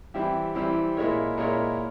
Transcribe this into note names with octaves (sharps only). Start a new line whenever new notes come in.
E3 G3 C4 E4 G4
E3 G3 C4 E4 G4
A#2 G#3 E4 A#4 C#5
A#2 G#3 E4 A#4 C#5